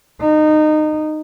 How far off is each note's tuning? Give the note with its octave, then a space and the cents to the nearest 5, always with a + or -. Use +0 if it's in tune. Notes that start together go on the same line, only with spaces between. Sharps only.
D#4 -20